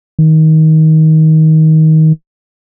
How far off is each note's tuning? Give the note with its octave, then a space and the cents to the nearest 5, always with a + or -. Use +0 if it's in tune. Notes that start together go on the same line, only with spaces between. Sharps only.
D#3 +20